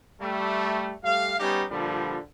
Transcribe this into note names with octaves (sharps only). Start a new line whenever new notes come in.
G3 A3
G3 A3 F5
G3 B3 C#4 D#4 G4
A#2 D3 F3 G3